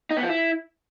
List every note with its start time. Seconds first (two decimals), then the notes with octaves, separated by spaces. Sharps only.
0.11 D#4
0.17 B3
0.23 F3
0.29 E4